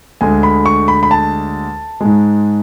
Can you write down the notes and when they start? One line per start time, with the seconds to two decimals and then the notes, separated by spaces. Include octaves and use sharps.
0.21 D2 D3 G#3 G#5
0.43 B5
0.66 C#6
0.88 B5
1.03 B5
1.11 A5
2.01 G#2 G#3